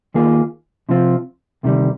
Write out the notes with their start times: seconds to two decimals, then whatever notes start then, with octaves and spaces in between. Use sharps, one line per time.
0.14 D#2 D#3 A#3 F4 G#4
0.89 C3 F3 C4 F4
1.63 D2 C3 D#3 G3